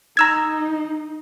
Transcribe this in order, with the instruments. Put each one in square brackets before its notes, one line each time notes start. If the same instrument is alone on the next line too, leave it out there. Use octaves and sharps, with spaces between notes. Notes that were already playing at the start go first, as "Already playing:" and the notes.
[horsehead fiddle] D#4 [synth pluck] A#5 E6 G#6